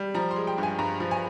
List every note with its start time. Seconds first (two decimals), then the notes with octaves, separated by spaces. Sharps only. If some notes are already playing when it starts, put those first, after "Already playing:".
Already playing: G3
0.14 F3 A#5
0.31 G#3 C6
0.47 G5
0.58 G2
0.63 G#5
0.79 G2 A#5
1.00 F3
1.11 G#5